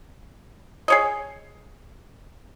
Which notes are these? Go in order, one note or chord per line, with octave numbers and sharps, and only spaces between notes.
G#4 C#5 D#5